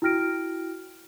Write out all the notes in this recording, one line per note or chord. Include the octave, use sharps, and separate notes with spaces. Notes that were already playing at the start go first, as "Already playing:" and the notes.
E4 F#4 G5 F6 A#6 D7